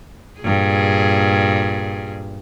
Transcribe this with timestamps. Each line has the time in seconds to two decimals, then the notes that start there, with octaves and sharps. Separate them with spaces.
0.41 G2 A#2 G#4